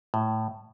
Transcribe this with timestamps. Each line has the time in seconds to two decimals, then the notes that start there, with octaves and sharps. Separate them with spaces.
0.14 A2